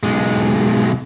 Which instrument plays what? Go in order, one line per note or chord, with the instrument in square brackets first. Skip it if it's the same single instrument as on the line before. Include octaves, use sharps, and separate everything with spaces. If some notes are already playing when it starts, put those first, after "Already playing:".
[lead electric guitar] B1 G#3